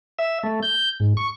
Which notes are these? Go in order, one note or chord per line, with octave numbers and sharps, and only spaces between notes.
E5
A3
G6
G#2
C#6